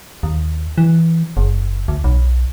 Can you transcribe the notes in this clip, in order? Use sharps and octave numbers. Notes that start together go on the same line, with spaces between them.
D#2
E3
F#1
D2
B1